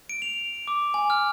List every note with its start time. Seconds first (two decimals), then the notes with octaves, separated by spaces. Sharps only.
0.09 D7
0.22 F7
0.67 D6
0.94 G#5
1.10 F6